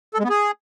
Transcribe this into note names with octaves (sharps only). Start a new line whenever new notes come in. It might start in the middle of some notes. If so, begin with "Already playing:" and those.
A4
G#3
B3
G#4